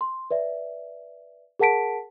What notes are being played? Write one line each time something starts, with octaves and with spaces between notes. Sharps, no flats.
C6
B4 D5 E5
G#4 A#4 F#5 A5 B6 D7